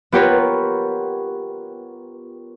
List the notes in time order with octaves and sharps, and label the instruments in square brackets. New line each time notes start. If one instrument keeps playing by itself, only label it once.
[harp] B3 F4 G4 A#4 B4 C#5